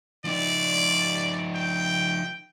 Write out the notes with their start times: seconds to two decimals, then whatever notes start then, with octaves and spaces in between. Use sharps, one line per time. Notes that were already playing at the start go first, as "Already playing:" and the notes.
0.25 F3 D#4 D5
1.55 G5